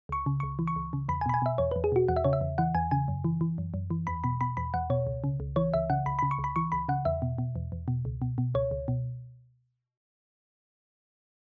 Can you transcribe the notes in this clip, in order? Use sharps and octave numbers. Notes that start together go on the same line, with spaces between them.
C#2 C#6
C#3
C#2 C#6
E3
C#6
C#2
C#3
E2 B5
G#5
B2 B5
G#5
B2 E5
E2 C#5
B4
E2
G#4
B2 F#4
E2 F#5
E5
C#3 C#5
E5
E2
E3 F#5
E2 G#5
C#3 G#5
F#2
E3
E3
F#2
F#2
E3
E2 B5
B2 B5
B2 B5
E2 B5
E2 F#5
B2 C#5
C#2
C#3
C#2
E3 C#5
C#2 E5
C#3 F#5
C#2 B5
B5
C#3
C#6
C#2
B5
E3 C#6
C#2 B5
C#3 F#5
E2 E5
B2
B2
E2
E2
B2
C#2
B2
B2
C#2 C#5
C#2
B2